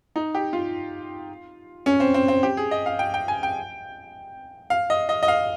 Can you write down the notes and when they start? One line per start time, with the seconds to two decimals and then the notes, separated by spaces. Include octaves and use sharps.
0.16 D#4
0.35 G4
0.53 F4
1.86 C#4
2.00 C4
2.14 C4
2.28 C4
2.43 G4
2.57 G#4
2.71 D#5
2.86 F5
2.99 G5
3.14 G5
3.28 G#5
3.43 G5
4.70 F5
4.90 D#5
5.09 D#5
5.23 D#5
5.28 F5